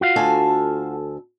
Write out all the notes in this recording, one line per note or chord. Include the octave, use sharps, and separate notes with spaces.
F4 F#4 F5
D2 A4 G#5